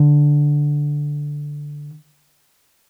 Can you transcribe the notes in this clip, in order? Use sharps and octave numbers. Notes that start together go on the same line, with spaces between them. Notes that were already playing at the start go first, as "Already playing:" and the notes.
Already playing: D3